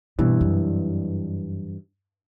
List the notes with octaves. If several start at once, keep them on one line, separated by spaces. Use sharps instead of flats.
G2 B2 E3
F#2